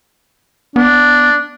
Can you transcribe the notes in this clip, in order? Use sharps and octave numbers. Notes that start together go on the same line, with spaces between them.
B3 D4